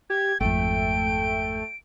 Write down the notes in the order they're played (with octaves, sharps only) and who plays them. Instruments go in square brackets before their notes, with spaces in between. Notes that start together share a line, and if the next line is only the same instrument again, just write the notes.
[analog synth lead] G4 [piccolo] G#6
[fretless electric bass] G#1 F2 [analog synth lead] A3 [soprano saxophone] G5 [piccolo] D7